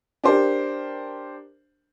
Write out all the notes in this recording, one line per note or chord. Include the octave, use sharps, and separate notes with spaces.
D4 G4 A#4 C5